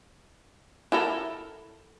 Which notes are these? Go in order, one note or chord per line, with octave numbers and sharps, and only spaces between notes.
E4 A4 A#4